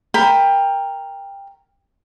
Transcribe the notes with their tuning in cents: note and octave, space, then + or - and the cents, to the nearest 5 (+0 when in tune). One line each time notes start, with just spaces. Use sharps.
A#4 +0 G5 +15 B5 +5